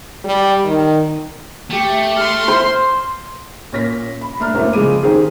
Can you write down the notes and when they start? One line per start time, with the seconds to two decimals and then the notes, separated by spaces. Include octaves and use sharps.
0.24 G3
0.64 D#3
1.70 A3 G4
2.17 C6 F6
2.48 C5
3.72 A#2 C#4 A#6 B6
4.21 B5
4.40 A3 D4 A#5 F6
4.54 F#2 A3 A#3 C4 C#4 E4
4.73 C#3 F3 G#3 D6 D#7
5.03 D#3 C4 D#4 G4 G#4